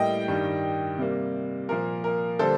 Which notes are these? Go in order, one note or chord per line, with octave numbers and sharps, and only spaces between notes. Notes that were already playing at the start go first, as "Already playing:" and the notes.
Already playing: A2 G3 A#3 D#5 G5
G2 D#3 G3
C3 G3 A#3
A#2 F3 A#3 A#4
A#4
D3 G3 A#3 A4 C5